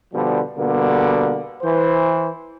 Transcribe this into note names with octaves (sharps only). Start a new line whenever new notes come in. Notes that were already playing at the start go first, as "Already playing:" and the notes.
B2 D3 F3 G3
B2 D3 G3 A#3
E3 C5